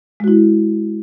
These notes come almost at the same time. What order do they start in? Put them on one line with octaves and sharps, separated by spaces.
G#3 F#4 E4